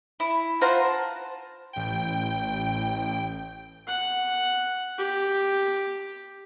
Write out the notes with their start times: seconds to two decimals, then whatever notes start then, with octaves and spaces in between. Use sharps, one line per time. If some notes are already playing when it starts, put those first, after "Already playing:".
0.20 E4
0.61 F4 C5 F#5 A#5
0.85 A5
1.73 A1 G5
3.87 F#5
4.98 G4